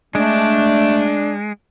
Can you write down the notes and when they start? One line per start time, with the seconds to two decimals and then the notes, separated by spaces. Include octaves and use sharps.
0.15 G#3 A3 D4